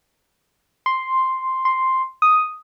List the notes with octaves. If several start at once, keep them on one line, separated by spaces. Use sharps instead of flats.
C6
C6
D#6